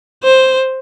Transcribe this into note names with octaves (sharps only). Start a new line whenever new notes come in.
C5